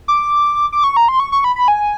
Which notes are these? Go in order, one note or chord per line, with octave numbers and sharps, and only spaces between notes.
D6
D6
C#6
A#5
C6
C#6
C#6
B5
B5
G#5